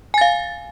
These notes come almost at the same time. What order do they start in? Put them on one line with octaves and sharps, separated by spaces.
G#5 A6 F5